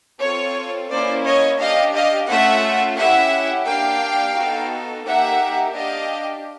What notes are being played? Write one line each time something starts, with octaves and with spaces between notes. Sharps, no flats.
C4 F4 A4 C#5
A#3 C#4 E4 C5 D5
C#5 D#5
D4 G4 D#5 F5
D#5 F5
A3 C#4 F4 A4 E5 F#5
C#4 E4 G4 E5 F#5
A#3 D4 G4 F5 G5
B3 D#4 F#4 A4
A#3 D#4 G4 E5 F#5
D4 G4 D#5 F5